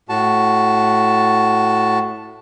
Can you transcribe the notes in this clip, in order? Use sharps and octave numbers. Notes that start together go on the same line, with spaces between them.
A2 F#4 A5